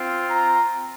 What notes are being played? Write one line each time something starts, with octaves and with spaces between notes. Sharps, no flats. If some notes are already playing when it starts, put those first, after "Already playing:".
Already playing: C4 F4
A#5